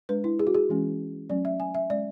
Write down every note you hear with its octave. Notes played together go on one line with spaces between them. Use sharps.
G#3 D4 B4
E4
G#4
F#4
G#4
E3 G#3 C#4
F#3 A3 C#4 D5
E5
G#5
E5
G#3 C#4 D5